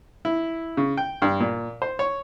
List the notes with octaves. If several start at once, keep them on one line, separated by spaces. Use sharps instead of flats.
E4
C#3
G5
G2
A#2
C5
C#5